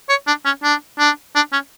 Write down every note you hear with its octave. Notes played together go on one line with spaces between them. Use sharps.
C#5
D4
C#4
D4
D4
D4
C#4